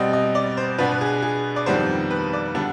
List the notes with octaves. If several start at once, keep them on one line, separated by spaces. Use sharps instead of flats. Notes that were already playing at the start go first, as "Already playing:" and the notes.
Already playing: B2 G3 C4 D#5
D#5
D5
C5
B2 B3 D4 B4
B4
G#4
G#4
D5
F2 D#3 G3 B3 C5
B4
D5
D3 G3 B3 D4